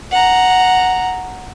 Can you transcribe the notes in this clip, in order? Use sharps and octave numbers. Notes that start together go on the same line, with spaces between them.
F#5 A#5